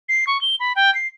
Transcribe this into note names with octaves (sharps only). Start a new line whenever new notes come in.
C7
C#6
G7
B5
G5
C7